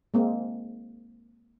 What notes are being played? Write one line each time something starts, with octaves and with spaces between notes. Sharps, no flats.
G#3 A#3 C4